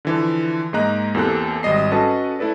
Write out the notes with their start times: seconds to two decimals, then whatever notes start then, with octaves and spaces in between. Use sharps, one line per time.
0.05 D3 E3 F3
0.73 G#2 G#3 A#3 D#5 A#5 F#6
1.15 E2 A#3 C4 G4 A4 F#6
1.63 G#1 G3 D#5 C7
1.91 C#4 F#4 A4 B4 D#5 A5
2.39 A3 E4 A4 B4 D5